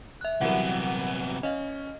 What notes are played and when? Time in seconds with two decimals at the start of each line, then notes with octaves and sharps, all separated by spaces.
0.21 E5 F#6
0.41 C3 E3 F#3 G3 B3 A#4 F#5
1.43 C#4 D#5 F5